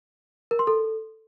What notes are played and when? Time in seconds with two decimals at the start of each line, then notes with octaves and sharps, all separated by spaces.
0.51 A#4
0.59 C6
0.67 A4